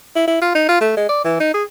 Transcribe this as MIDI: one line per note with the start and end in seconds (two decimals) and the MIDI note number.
0.16 0.26 64
0.27 0.37 64
0.42 0.51 65
0.55 0.66 63
0.69 0.79 65
0.81 0.93 57
0.97 1.09 56
1.09 1.22 74
1.24 1.39 52
1.40 1.54 63
1.54 1.63 68